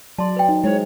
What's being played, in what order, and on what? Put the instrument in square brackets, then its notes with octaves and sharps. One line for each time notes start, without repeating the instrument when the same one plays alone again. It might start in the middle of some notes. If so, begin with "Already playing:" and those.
[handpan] F#3 [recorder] D5 [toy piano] A5 C6
[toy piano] B4 G5
[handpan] D#4
[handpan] G#3 [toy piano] E4 C5 [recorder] C#5